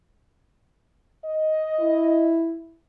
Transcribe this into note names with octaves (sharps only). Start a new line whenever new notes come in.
D#5
E4